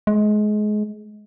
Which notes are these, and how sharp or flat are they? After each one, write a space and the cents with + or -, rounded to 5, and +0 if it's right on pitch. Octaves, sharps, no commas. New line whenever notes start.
G#3 +25